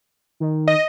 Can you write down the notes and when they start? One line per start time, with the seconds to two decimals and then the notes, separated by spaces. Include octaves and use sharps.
0.40 D#3
0.68 D#5